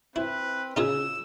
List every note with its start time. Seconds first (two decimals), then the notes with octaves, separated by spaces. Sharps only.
0.16 C4 E4 B4
0.76 C#3 D#4 F4 G#4 E6